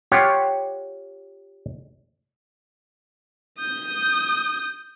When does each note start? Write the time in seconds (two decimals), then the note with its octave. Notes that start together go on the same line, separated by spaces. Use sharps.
0.12 F4 G4 C#5 F#5
3.59 D#6 G6